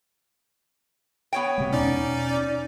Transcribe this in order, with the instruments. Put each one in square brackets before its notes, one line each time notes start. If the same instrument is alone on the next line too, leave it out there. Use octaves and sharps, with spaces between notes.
[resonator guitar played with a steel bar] B3 C#5 G5
[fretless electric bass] C3 G#3
[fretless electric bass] E2 B2 [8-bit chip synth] C#4 D#4 [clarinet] D5